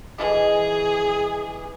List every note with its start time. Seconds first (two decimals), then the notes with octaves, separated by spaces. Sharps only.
0.18 E3 G#4 D#5